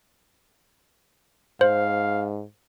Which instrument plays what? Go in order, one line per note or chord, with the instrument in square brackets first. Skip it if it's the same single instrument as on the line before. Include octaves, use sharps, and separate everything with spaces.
[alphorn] G#2 [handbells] C5 [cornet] F5